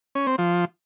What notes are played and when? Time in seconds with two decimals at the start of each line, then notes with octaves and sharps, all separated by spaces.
0.15 C#4
0.27 C4
0.38 F3